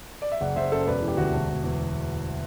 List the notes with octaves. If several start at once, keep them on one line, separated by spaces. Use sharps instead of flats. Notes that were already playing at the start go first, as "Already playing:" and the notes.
D5
E5
F#1 D5 F#5
F#1 C5 E5
F#2 A4 C5
E1 B4 D5
E3
G4
D2 F#4
E1
E1
E2